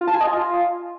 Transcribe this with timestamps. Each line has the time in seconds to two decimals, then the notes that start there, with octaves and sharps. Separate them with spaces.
0.01 F4
0.08 A5
0.14 G#5
0.21 D#5
0.27 F4